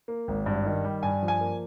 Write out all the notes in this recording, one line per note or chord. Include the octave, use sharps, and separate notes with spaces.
A#3
G#1
G2
D#3
G3
G2 G#5
F3
G#5
A#3